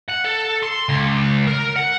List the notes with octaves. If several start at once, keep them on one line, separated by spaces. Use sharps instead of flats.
F#5
A4
C6
C#2
A#4
F#5